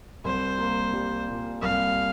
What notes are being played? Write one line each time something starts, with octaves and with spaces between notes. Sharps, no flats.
C2 C5
A#3
G3
A#2
C2 F5